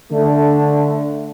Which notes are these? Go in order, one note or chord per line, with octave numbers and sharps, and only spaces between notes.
D3 A3 D4